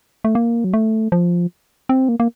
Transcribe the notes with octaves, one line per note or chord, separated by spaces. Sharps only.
A3
A#3
F#3
A3
F3
C4
A#3
A#3